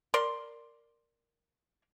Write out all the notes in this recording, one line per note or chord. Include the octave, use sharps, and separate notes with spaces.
A#4 D5 C6